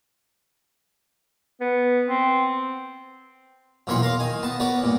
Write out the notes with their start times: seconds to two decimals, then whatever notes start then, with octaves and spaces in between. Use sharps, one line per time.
1.61 B3
2.08 C4
3.87 B1 E2 A#2 C#5 B5 C6
4.02 A#4 F5
4.19 D#3 G#5
4.43 B3 A5
4.60 B3 A#4 C#5 D5
4.82 G2 A#2